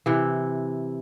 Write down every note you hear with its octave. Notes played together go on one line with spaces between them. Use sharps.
C3 E3